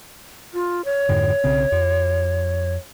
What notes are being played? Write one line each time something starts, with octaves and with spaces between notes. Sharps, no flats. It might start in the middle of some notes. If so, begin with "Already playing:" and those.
F4
C#5
F2 G#2 D3
B1 C#3 C4
F2